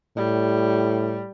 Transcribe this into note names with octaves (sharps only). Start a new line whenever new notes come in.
A2 G3